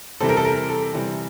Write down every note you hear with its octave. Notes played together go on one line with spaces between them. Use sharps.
C3 E3 G3 C4 A4
A#4
A4
A#4
A4
C3 E3 G3 C4